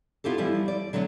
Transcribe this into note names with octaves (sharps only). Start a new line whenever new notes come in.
B3 E4 F4 G4 A4
E3 F3 G3 E4
D5
D3 F#3 A3 B3